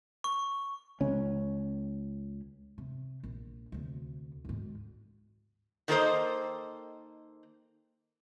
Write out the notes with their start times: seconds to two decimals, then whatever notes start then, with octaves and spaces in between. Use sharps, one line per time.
0.24 C#6
1.00 C#2 C#4
2.78 C3
3.24 A#1
3.72 D2 C3
4.45 D2 G#2
5.88 D#3 A#3 A4 B4 C5 D#5